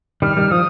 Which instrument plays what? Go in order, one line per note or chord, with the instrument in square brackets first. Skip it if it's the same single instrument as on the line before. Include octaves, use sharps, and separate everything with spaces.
[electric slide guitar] D#3 G3 [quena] F6
[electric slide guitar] D#3 G3
[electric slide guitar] F3 [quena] D#6